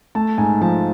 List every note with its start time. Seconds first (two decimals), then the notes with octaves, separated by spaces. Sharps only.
0.15 A3 A5
0.38 G#2 G#5
0.61 F3 A5